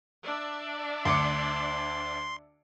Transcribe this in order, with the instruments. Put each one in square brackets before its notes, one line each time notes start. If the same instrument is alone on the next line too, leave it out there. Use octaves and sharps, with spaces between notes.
[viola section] D4 D5 E5
[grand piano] D2 D6 C#7 [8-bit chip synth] C6